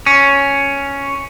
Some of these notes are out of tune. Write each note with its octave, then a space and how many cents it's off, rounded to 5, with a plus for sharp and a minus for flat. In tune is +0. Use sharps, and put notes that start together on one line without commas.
C#4 +5